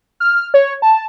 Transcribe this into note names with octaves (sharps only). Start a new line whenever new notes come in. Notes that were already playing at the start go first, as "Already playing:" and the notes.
F6
C#5
A5